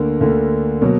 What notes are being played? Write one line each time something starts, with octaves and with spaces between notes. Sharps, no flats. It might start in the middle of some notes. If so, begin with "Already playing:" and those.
Already playing: D2 D3 A#3
D2 D3 A#3
B2 F#3 A#3